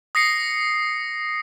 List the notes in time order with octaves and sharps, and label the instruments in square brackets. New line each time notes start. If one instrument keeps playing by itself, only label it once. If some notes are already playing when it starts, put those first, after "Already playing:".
[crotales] D#6 A#6 C7 C#7